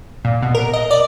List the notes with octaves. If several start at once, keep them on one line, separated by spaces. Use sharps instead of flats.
A#2
B2
A#4
D#5
D5